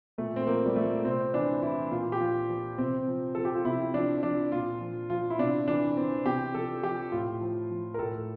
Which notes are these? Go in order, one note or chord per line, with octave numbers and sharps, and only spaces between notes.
A#2 A3
C4
F3 A#3
G3
F3 A3
C3 C4
E3 D4
E3 E4
A#2 F4
G4
F3 F4
F3
C3 C4
F3
F3 A4
G4
F4
C3 E4
F3 D4
F3 D4
A#2 F4
F3
F3 F4
E4
C3 D4
E3 D4
E3 C4
C3 G4
F3 A4
F3 G4
A2 F4
F3
F3
A#4
A2 A4